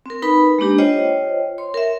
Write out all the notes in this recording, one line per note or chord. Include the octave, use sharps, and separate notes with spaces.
C4 A#4
D#4 B4 B5
G#3 A#3 D4 G4
F4 C5 C#5 D#5 G5
C#5 C6
A#4 E5